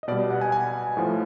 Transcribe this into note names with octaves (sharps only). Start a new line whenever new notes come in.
D#5
B2 G3 D5
D#5
F#5
G#5
G#5
A2 F3 A3